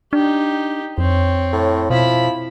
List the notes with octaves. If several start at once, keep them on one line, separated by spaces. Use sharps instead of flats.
D4 D#4 G4
F2 C4 C#5
A2
B2 F3 E4 B5